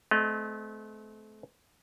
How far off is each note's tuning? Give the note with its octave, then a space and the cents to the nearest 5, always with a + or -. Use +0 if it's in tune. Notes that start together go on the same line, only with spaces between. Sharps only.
A3 -35 C4 -30 D#5 -20